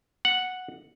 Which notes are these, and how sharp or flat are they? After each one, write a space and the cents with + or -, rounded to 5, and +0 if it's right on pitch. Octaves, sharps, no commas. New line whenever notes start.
F#5 -5